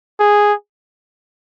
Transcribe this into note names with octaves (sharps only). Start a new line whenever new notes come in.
G#4